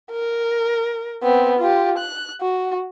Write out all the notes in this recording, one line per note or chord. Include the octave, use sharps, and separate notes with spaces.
A#4
B3 C4
F4 G4
F#6
F#4